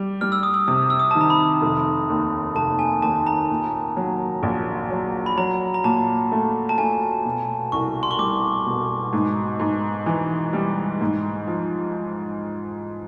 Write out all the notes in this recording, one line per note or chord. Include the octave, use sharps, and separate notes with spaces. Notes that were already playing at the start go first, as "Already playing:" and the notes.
Already playing: G3
G3 F6
E6
D#6
E6
C3 D#6
E6
D#6
D#3 A5
A#5
B5
F1
D#2
F1 A5
G#5
D#2 A5
A#5
A#2
F#3
A#1
F#3
B5
F#3 A#5
A#5
A#2 A5
A3
A5
A3 G#5
B2
C2 C#6
C6
C#6
G3 D6
B2
G#2
G#2
E3
G3
G#2
F3